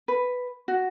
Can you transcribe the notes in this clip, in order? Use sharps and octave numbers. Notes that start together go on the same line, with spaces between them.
B4
F#4